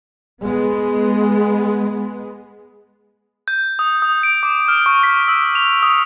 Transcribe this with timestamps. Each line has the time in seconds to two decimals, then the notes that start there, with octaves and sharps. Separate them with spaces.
0.43 G#3 B3
3.48 G6
3.79 D#6
4.02 D#6
4.23 D7
4.43 D6
4.68 F6
4.86 C#6
5.03 B6
5.28 E6
5.55 F7
5.83 D#6